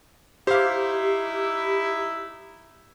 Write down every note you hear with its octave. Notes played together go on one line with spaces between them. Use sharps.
D#4 E4 G4 C5 F5